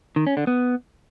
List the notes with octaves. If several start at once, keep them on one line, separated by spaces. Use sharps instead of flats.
D#3
C#4
D3
B3